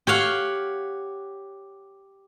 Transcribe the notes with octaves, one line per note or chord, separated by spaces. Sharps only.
G4 C#5 F5 F#5